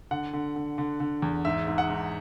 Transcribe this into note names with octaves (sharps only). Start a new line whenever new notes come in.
D3 F#5
D3
D3
D3
D3
E2
G#2 E5
G#2
F#5
G#2